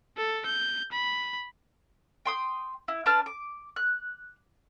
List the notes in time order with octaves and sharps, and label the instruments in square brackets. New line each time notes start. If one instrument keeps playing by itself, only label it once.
[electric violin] A4
G6
B5
[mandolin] G5 C6 D#6
E4
D4 B4 A5 F6
D6
F#6